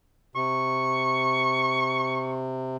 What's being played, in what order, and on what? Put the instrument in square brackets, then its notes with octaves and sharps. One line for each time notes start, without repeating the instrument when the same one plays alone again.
[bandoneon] C3 [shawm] C#6